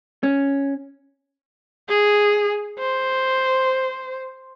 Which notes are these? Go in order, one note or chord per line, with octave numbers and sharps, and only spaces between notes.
C#4
G#4
C5